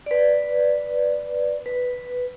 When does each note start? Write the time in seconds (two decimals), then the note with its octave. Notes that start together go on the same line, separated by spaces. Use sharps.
0.06 B4 D5
1.66 B4